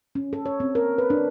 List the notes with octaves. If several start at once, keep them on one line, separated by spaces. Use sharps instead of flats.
C#4
A4
C#5
C4
A#4
B4
D4